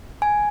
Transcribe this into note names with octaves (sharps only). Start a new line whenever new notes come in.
G#5